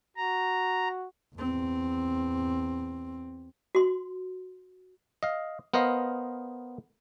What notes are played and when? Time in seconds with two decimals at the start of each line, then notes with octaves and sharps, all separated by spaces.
0.17 F#4 A#5
1.35 E2 C4
3.75 F#4 C6
5.23 D#5 F5
5.74 B3 A#4 C5 D#5 F5